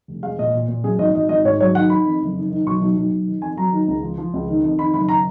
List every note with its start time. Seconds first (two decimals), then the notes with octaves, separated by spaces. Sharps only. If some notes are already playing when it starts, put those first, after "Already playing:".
0.08 F1
0.23 G#3 F5
0.39 A#2 D#5
0.54 A#2
0.69 A#2
0.84 F#2 G#4
0.99 G#1 D#5
1.14 G#1 D#5
1.29 G#1 D#5
1.44 G#2 C#5
1.59 F#3 C#5
1.75 D#3 F#5
1.90 D#3 B5
2.06 F2
2.21 F#1
2.36 D#3
2.51 D#3
2.66 B1 C#6
2.81 B1
2.96 B1
3.11 B1
3.27 D#3
3.42 F2 G#5
3.57 F#3 A#5
3.72 D#3
3.88 C#2
4.03 F3
4.18 F3
4.34 C#2
4.49 D#3
4.63 F2
4.79 D#3 B5
4.94 F#1 B5
5.09 A#5